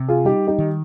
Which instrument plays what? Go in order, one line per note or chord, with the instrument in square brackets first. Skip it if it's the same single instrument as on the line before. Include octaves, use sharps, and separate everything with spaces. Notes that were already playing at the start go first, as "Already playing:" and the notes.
Already playing: [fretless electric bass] C3
[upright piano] F4 G#4
[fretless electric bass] G3 [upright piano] D#4 G4
[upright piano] D#4 G4
[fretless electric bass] D#3